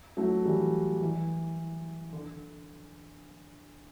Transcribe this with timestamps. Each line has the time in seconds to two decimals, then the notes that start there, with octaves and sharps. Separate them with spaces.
0.17 F#3 A3
0.45 E3 G3
1.01 E3
2.13 D3